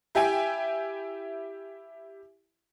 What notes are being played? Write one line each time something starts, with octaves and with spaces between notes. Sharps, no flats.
E4 G4 E5 G5 G#5